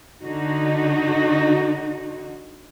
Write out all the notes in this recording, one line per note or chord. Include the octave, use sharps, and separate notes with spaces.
D3 D#4 F#4